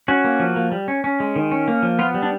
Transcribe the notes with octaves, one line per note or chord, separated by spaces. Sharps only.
C#4 F#4
A#3
F3
A#3
G3
C#4
C#4
G#3
D#3
C#4
A#3
F3
B3 F4
G3
D4